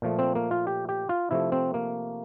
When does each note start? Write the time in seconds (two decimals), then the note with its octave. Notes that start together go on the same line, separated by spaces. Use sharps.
0.02 A#2 F3 A3
0.19 C4
0.35 A#3
0.51 F4
0.67 G4
0.89 G4
1.09 F4
1.31 C3 F3 A3 E4
1.52 C4
1.74 A#3